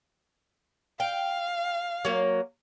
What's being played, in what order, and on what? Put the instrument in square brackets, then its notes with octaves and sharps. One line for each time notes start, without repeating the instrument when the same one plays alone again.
[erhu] F5 [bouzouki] G5
[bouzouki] F#3 A#3